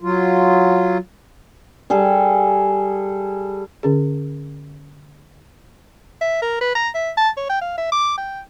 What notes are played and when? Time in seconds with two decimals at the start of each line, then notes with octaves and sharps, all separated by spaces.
0.01 F#3 F4
1.90 G3 G#4 A4
3.83 D3 C#4 G#4
6.21 E5
6.42 A#4
6.61 B4
6.75 A#5
6.95 E5
7.17 A5
7.37 C#5
7.50 G5
7.61 F5
7.78 E5
7.92 D6
8.18 G5